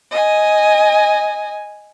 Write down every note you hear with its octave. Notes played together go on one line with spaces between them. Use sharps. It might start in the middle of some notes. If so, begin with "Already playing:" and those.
D#5 G#5